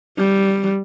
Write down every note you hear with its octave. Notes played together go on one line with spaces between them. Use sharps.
G3